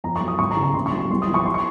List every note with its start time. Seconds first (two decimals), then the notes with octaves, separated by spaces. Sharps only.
0.04 F2 A#5
0.16 C#6
0.21 F#3
0.28 D#6
0.39 G#1 C#6
0.51 A#5
0.57 C#3
0.63 A#5
0.74 A#1 C6
0.86 C#6
0.93 F#3
0.99 C6
1.10 C2 C6
1.22 D#6
1.28 F3
1.34 C#6
1.46 C6
1.54 C#6